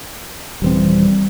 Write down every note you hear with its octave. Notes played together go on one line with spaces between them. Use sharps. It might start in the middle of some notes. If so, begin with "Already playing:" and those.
D#1 E3 G3 C4